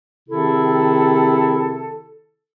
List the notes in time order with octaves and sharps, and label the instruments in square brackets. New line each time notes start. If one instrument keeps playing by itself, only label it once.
[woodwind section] C3 D#3 C4 E4 G#4 A4